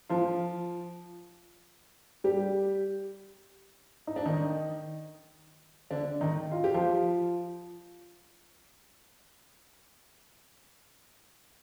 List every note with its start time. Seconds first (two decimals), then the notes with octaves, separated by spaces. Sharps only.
0.09 F3 F4
2.24 G3 G4
4.07 D#4
4.16 D4
4.26 D#3 D#4
5.91 D3 D4
6.21 D#3 D#4
6.52 F4
6.64 G4
6.74 F3 F4